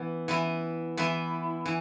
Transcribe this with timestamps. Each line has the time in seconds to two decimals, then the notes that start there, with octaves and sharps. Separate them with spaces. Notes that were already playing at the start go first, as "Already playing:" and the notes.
Already playing: E3 B3 E4
0.28 E3 B3 E4
0.97 E3 B3 E4
1.66 E3